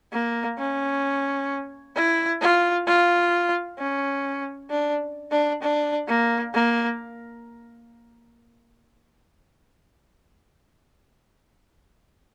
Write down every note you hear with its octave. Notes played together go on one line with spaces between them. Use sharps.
A#3
C#4
E4
F4
F4
C#4
D4
D4
D4
A#3
A#3